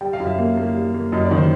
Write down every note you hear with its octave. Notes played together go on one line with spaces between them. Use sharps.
G3 G5
F5
F#2
E5
A#3
A#3
G3
A#3
F#2 D#5
D5
D#3
C5